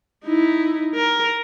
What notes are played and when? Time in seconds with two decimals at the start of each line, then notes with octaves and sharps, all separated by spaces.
0.25 D#4 E4
0.95 A#4